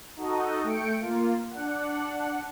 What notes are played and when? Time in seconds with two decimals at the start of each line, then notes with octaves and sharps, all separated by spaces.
0.17 D#4 F#4 A4 D#5
0.64 A3 G5 C#7 D7
1.00 A#3 F4
1.50 D4 F#5